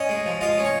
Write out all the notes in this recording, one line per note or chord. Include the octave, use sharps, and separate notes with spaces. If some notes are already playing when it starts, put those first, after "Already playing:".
Already playing: C#4 D#5
G#3
F3
F4 D#5
C#4
C#5